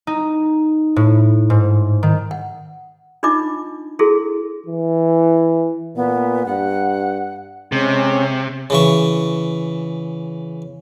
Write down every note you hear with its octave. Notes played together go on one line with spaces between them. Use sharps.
D#4
A2
G#2
D#3
F#5
D4 D#4 F4 D#5 D6
E4 F#4 G#4 A4
E3
A#2 B3
G2 F#5
C3 G#3 C#4
C#3 E3 C#6